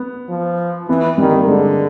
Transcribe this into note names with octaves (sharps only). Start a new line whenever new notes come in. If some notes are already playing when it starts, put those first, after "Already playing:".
Already playing: B3
F3
E3 B3
D#3 G3
A#3
D3 G#3